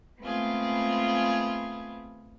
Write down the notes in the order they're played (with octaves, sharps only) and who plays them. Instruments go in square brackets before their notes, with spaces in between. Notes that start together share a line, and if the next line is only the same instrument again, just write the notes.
[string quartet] G#3 A3 B3 C4 F4 G#4